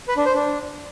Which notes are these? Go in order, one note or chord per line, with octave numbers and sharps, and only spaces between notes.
B4
D4
C5
D4